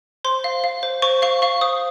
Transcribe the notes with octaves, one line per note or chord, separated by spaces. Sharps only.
C5 C6
F5
F5
C5
C5 C#6
F5 C#6
F5 C#6
C5 D#6